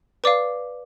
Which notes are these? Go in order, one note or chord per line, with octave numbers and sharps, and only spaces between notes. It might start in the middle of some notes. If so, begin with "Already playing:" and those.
B4 D5 F5 D6